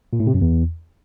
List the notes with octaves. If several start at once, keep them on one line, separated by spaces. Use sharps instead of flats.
A#2
A2
C3
F#2
E2